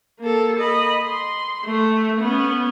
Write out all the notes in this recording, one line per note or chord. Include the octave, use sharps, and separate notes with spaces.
A#3 A4
D#5 B5
C6
A3
B3 C#4